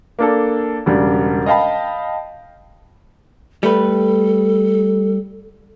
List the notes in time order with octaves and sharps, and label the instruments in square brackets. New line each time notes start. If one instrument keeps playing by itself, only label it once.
[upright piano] A#3 D4 A4
E1 C#3 G3 D4
D#5 F5 G5 A5 B5
[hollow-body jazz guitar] G3 A3 B4 [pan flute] A4